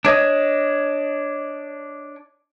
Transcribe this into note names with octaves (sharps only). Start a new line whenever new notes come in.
D4 C#5 D#5